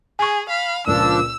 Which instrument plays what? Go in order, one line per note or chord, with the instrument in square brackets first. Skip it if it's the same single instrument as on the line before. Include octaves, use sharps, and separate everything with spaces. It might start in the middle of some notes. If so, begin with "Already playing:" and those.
[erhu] G#4 [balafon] G#5 C#6
[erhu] F5 [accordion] B5
[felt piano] C#2 A#2 [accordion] F3 D4 [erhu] E6